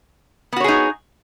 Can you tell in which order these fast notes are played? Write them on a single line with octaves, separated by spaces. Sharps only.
B3 F#4 C#5 G#4 D#4